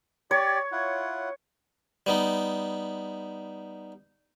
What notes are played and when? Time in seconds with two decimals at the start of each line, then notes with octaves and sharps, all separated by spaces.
0.31 G4 C#5 D5
0.72 E4 F4 F#5
2.07 G3 B3 D#4